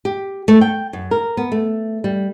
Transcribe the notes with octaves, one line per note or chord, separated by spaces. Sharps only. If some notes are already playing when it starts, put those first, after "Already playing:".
G4
A3
G5
F#2
A#4
B3
A3
G3